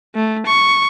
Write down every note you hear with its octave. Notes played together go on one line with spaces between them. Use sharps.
A3
C#6